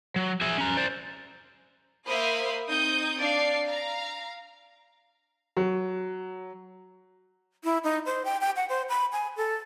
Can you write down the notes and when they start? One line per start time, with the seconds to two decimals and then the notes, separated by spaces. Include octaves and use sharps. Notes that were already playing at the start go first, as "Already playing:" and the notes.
0.16 F#3
0.41 G#4 E5
0.58 C#4 A#5
0.77 C5 D5
2.07 A#3 C5 E5 F5 B5 D#6
2.69 C4 D#4 D#6 G6
3.19 D4 D5 F5 C7
3.66 F5 A#5
5.57 F#3
7.64 E4
7.84 D#4
8.06 C5
8.25 G5
8.41 G5
8.56 F#5
8.69 C5
8.89 B5
9.12 G#5
9.37 A4